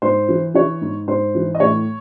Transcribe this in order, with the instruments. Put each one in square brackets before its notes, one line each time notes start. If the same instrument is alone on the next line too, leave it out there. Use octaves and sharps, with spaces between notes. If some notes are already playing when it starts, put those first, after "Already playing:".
[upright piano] G#2 C5
E3
E3 C#5
G#2
G#2 C5
E3
D#5
A2 C#5